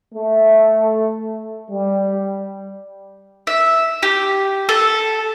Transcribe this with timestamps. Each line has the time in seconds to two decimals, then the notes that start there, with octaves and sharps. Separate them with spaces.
0.14 A3
1.70 G3
3.47 E5
4.03 G4
4.69 A4